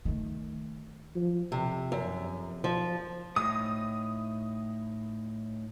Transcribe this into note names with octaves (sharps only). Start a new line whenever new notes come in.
D#3 A3
F3
F2 C3
F#2
F3
A2 D#4 D#6